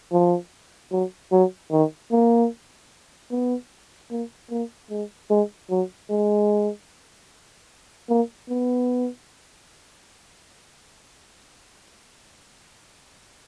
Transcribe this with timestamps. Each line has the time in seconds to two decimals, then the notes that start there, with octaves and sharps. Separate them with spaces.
0.12 F3
0.92 F#3
1.32 F#3
1.72 D#3
2.11 A#3
3.31 B3
4.11 A#3
4.51 A#3
4.91 G#3
5.30 G#3
5.70 F#3
6.10 G#3
8.09 A#3
8.49 B3